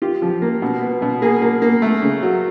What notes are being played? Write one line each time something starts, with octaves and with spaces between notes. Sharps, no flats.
F4 G4
F3
A#3
B2
B3
B2
A#3 G#4
A#3
A#3
A3
C#3
F#3